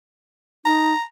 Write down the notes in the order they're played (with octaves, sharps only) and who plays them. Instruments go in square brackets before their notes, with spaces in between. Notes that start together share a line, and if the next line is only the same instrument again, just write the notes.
[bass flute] D#4 [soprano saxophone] A#5